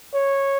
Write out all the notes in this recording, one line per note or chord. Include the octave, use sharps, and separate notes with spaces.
C#5